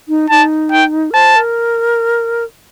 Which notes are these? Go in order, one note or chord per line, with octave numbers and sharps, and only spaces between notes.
D#4
D#4 A5
G5
A#4
C5 A5
A#4